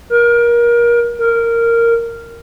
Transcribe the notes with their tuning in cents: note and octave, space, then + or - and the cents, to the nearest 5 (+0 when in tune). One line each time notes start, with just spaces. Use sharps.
A#4 +25
A#4 -10